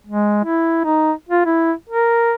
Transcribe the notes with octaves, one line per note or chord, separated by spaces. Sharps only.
G#3
E4
D#4
F4
E4
A#4